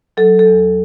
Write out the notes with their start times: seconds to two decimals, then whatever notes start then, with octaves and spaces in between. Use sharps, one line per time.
0.17 F#3 A4
0.39 A4
0.46 E2